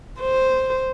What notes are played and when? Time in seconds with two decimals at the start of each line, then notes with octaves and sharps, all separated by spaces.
0.20 C5